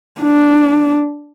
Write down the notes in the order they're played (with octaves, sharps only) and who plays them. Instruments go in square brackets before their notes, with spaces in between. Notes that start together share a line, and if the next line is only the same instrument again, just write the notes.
[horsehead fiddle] D4